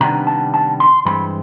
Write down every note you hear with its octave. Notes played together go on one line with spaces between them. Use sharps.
C3 D#3 G3 B3 D4 A#5
A5
A5
C6
G2 E3 G#3 C4 B5